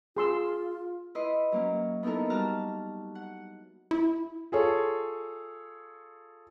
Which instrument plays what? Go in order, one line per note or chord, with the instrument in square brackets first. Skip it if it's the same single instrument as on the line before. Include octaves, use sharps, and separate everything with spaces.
[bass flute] F4 [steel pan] G#4 C6 E6
[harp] E4 B4 D#5 C6
F#3 A#3 C#4
B3 D#4 E4 A4 A#4
G3 F#4 A5 A#5 F6
F#5
[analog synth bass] E4
[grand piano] F4 G#4 A4 C#5